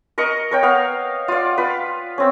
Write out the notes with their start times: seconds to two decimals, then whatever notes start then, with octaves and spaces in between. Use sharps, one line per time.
0.18 A#4 D#5 C#6
0.51 A#4 C#5 G5
0.63 B3 F5
1.28 F4 D5
1.58 F4 B4
2.18 C4 C#4